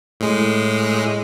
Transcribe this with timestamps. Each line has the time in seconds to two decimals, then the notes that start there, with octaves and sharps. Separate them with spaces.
0.20 A2 G#3